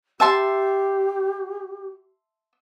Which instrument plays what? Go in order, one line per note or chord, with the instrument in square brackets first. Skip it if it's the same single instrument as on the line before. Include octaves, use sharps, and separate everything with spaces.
[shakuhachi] G4 [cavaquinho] E5 A5 C6